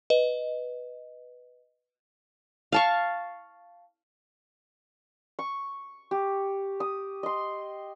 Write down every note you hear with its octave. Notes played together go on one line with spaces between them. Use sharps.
B4 D#5
F5 A5 C#6
C#6
G4
D#6
D#5 C6